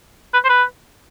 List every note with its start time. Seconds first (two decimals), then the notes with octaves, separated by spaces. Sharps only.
0.33 B4
0.45 C5
0.49 B4